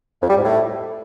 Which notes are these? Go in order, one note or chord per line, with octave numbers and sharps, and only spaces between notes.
F2
G3
G#2
A2